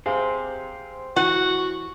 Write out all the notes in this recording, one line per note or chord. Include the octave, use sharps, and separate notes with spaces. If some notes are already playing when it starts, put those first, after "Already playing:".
G4 G#4 C5 F5
E3 F#4 F#5